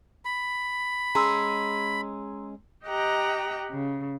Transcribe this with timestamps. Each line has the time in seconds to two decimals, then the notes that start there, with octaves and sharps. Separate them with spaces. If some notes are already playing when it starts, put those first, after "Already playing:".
0.25 B5
1.15 G#3 C#4 G#4 A#5 C6 E6
2.85 G4 D#5 F#5 G5 A#5
3.71 C#3